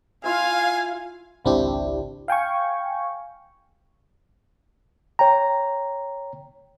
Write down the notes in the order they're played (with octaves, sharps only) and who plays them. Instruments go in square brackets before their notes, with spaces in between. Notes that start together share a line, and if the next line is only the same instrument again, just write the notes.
[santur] E4 F4 E5 [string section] F5 [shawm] G#5
[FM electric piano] G#1 C#2 C4 D4 E4 G4
F5 G5 G#5 C#6
[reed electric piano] C#5 G5 A#5